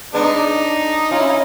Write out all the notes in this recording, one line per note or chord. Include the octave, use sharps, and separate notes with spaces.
G#3 B3 D4 D#4
C#4 F4
E4
D#4